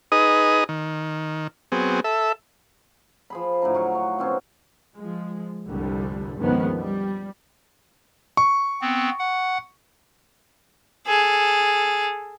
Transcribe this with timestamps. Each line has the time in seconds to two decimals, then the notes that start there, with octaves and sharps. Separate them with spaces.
0.12 D#4 G#4 B4 D#5 D#6
0.69 D#3
1.72 F#3 B3 C4 G#4
2.04 A4 E5
3.30 F3 G#4 B5
3.62 A2 D3 D#4 A#5
3.74 F#3 F#4 F5 C#6
3.95 C#5
4.18 B2 D#3 C4 C#4
4.96 F3 G#3
5.68 F1 C2 G2 D3 G3
6.38 G1 C#2 D#3 F3 G#3 B3
6.78 G3
8.37 C#6
8.81 B3 C4
9.19 F#5
11.07 G#4 A4